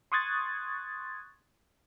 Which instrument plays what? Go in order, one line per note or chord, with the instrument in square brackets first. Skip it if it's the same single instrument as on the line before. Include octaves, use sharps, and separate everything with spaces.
[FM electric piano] C6 C#6 D#6 F#6 G#6 A6